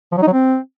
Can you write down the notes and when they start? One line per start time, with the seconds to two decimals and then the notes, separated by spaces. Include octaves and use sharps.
0.12 F3
0.17 F#3
0.22 D#4
0.27 F#3
0.32 C4